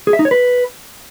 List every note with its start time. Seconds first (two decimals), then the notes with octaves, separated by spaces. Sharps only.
0.07 G#4
0.13 E5
0.19 D#4
0.25 C#5
0.31 B4